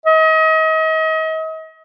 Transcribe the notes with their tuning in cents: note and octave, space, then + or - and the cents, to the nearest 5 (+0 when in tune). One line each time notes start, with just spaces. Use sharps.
D#5 +35